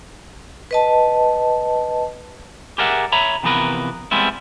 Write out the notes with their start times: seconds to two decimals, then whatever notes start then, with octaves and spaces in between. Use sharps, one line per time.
0.71 B4 D#5 A5
2.78 G4 G#4 A#4 D5 E5 F#5
3.12 C#5 E5 A#5 B5
3.43 C3 E3 F3 B3 A#4 B4
4.11 G3 G#3 B3 C4 E4